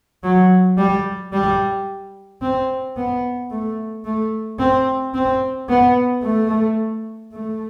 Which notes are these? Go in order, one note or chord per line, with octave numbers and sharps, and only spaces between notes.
F#3
G3
G3
C4
B3
A3
A3
C4
C4
B3
A3
A3